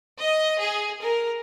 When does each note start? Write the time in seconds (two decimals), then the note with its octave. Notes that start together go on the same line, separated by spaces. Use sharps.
0.19 D#5
0.60 G#4
1.01 A#4